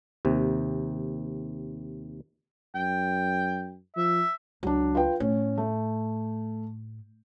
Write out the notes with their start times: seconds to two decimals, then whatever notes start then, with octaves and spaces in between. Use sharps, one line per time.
0.25 D#2 C3
2.75 F#2 G5
3.96 F3 E5
4.63 C#2 F#3 D4
4.95 F4 B4 G5
5.20 A2 C#4
5.58 A3